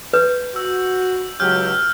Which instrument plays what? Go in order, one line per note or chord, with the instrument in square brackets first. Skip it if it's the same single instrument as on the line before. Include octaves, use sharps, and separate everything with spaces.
[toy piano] B4 [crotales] G6
[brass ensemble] F#4 [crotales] E6
[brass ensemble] C#2 F#3 G4 [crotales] F6 G6